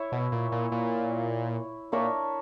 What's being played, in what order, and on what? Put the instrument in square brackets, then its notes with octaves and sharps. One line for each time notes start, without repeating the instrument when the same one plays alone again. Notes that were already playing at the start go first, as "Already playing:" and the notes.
Already playing: [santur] E4 C#5 E5
[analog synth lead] B2
A#2
A#2
A#2
[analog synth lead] A#2 [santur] D4 A#4 C#5 E5